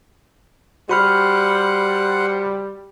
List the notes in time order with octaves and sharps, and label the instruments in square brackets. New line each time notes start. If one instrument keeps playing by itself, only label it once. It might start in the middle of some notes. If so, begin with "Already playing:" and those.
[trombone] G3 [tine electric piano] F#4 B5 F6 [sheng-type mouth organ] C5 F#5